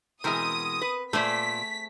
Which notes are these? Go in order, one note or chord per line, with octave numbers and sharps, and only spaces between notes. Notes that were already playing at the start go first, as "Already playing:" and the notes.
B2 E3 G#3 C4 A#4 D#6
B4
A#2 A3 G#4 C5 D5 B6